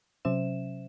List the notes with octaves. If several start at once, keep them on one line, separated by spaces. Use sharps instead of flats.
C3 F#3 C#4 C5 E5 E7